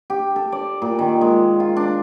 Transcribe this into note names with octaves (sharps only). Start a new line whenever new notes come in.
G4
A4
D5
A#2
D#3
G#3
F4
D4